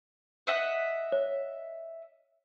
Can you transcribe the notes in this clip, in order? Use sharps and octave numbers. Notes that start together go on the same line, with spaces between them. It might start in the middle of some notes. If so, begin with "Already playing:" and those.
D#5 E5 F#5
C#5